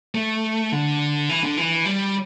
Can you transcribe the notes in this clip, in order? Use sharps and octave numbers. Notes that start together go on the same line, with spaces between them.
A3
D3
E3
D3
E3
G3